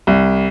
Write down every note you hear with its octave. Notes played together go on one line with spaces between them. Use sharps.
C2